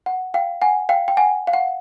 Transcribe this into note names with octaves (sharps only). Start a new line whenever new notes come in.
F#5
F5 G5
F#5 G#5
F5 G5
G5
F#5 G#5
F5
F#5